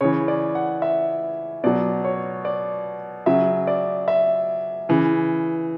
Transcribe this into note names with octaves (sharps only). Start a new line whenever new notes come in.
C#3 E3 C#5
D5
F#5
E5
B2 F#3 D5
C#5
D5
C#3 F#3 E5
D5
E5
C#3 E3